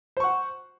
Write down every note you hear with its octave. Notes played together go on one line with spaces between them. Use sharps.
C5 F#5 C#6